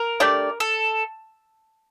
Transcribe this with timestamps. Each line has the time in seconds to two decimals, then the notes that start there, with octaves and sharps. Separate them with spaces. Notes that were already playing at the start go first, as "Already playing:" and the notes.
Already playing: A#4
0.20 A3 D4 G4 D5
0.60 A4